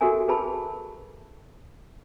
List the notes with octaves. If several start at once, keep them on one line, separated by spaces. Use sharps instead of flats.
F#4 G4 A4 A#4 E5 G#5
G#4 A#4 B4 A5 B5